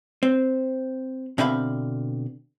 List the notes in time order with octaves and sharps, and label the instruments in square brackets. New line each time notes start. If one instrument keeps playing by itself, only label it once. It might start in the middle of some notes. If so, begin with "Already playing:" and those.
[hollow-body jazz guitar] C4
B2 D3 C4 E5 F5 B5